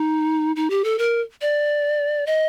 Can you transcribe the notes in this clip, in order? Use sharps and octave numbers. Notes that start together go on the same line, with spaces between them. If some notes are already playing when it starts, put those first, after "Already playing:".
Already playing: D#4
D#4
G4
A4
A#4
D5
D#5